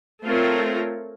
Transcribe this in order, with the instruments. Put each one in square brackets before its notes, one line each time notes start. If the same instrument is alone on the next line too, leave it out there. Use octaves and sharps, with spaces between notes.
[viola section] A3 C4 F4 A#4 C#5